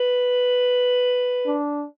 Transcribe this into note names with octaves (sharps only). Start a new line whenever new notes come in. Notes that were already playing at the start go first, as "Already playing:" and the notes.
Already playing: B4
D4